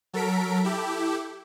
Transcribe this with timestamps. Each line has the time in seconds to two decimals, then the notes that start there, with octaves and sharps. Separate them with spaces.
0.13 F#3 A4 A#4 B6 D7
0.64 E4 G4 A4